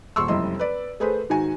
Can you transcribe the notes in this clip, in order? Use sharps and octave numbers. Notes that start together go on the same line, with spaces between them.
D#1 C6 C#6 E6
F1 F#2 G3 E4 D#5 C6
B4 D5
A3 G#4 B4 C5
G#2 D#3 F#4 G#5